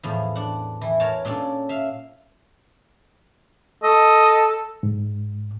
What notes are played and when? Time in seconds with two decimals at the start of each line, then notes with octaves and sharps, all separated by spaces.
0.03 E2 A2 F3
0.35 D4 F#5
0.81 E3
1.00 A#4 C#5 A5
1.25 A#2 C#4 D4 A4
1.69 E5 F5
3.83 A4 D#5
4.83 G#2